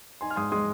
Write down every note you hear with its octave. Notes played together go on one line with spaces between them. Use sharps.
D#4 G#5 C6
F6
G#2 C6 D#6
G#3 C6 D#6